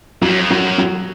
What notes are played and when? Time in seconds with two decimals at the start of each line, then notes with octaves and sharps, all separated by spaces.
0.22 F2 F#3
0.30 F#2
0.39 F2
0.50 F#2 F#3
0.78 F#3